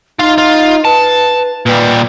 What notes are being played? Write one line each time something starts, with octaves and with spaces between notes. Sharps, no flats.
D#4 F4 F5
F4
B4 A5
A#2 G3 B4